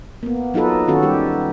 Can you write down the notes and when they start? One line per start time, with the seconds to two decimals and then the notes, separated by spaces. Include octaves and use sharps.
0.23 A#3 B3
0.54 F#3 D#4 F4 A4 B4
0.88 D#3 C#4 F#4 A4
1.03 G3 G4